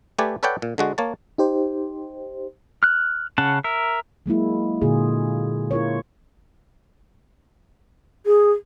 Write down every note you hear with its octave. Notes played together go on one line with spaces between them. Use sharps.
A3 G4 B4 D5 G#5
A4 B4 C#5 D5 F#5 G5
A#2
D3 G#3 F#4
A#3 C#5 A5
D#4 G4 C5
F6 F#6
C#3 C#4 F#5 A5
A#4 E5
F#3 G#3 A#3 E4
A#2 D3 F4 F#4 G#4
E4 F4 A#4 C#5
G#4